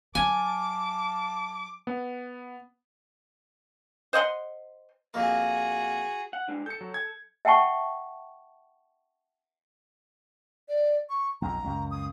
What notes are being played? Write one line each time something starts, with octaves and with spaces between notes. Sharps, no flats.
F#3 A#4 F5 G#5 A5 D6
B3
C5 D#5 F#5 C6
F2 A#3 F#4 G#4
F#5
G#3 D4
A4 G6 C#7
F#3
G#6
E5 F#5 G5 A5 C#6
D5
C#6
B1 F2 A#5
C#2 F#2
D#6